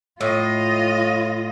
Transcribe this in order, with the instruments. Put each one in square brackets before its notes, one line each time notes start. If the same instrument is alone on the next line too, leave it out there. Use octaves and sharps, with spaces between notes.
[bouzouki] A2 [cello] F4 D#5